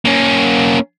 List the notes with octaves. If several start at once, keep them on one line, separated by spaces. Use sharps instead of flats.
A#3 C#4